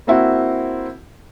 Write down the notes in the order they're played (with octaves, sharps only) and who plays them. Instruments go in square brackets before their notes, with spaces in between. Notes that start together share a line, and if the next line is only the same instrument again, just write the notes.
[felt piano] A#3 C4 E4 F#4